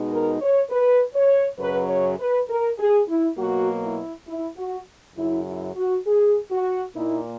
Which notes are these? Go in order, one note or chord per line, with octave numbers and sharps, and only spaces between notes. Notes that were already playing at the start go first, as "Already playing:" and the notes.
Already playing: B2 G#3 D#4
A#4
C#5
B4
C#5
F#2 C#3 F#3 B4
C#5
B4
A#4
G#4
E4
B2 F#3 A#3 F#4
E4
E4
F#4
F#2 C#3 F#3 E4
E4
F#4
G#4
F#4
A#2 A#3 D#4 E4